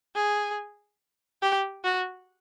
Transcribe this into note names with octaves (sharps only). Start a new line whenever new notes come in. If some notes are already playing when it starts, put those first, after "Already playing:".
G#4
G4
F#4